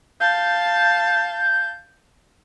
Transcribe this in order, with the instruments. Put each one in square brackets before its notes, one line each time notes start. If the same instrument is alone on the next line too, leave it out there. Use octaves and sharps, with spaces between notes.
[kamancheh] F5 A5 [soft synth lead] G6